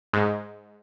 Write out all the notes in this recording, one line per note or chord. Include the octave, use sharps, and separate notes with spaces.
G#2